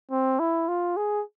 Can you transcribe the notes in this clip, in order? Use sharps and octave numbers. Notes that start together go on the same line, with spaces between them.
C4
E4
F4
G#4